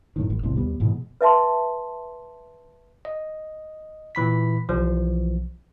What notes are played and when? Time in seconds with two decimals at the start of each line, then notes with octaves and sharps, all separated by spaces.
0.16 F#2 A2 D#3
0.30 G#1
0.43 E1 C2 A2 C4
0.56 D#2 G3 B3
0.80 G#2 B2 E3
1.21 B4 E5 A5 C6
3.05 D#5
4.15 A#2 E3 B5 B6
4.69 B1 E3 F3